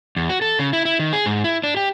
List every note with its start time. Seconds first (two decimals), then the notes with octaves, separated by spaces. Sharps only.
0.16 E2
0.29 F#4
0.42 A4
0.59 C#3
0.73 E4
0.85 E4
1.00 D#3
1.13 G#4
1.26 G#2
1.44 E4
1.64 D4
1.77 G4